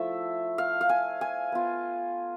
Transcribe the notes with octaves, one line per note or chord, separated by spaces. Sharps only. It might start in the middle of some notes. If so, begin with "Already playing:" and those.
Already playing: F3 A3 E4 E5
F5
F5
G#5
G#5
B3 F4